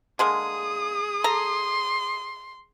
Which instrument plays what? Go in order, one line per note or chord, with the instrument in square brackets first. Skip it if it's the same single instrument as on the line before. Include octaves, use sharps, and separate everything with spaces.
[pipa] D3 G#3 A#3 [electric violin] G#4 D#6
[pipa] A4 A#5 [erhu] C6